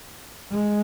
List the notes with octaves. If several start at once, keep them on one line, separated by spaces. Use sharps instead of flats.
G#3